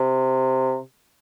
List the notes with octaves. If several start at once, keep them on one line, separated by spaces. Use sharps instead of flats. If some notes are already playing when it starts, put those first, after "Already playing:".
Already playing: C3